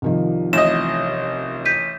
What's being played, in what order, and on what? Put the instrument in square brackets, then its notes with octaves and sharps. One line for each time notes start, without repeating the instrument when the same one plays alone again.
[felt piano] C2 D#3 F3
[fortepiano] A1 D#5 [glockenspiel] E7
[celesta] G6 B6 D#7